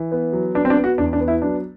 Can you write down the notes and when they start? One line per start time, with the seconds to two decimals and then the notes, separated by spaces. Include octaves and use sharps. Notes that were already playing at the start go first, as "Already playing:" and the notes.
Already playing: E3
0.12 B3
0.33 F#3
0.55 B3 D4
0.65 C4
0.70 D4
0.77 B3
0.84 F#4
0.98 E2 D4
1.13 D4
1.21 B3
1.28 E4
1.42 F#3 D4